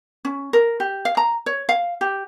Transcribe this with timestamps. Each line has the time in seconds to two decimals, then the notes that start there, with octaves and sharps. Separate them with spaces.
0.25 C#4
0.53 A#4
0.80 G4
1.05 F5
1.17 A#5
1.46 C#5
1.69 F5
2.01 G4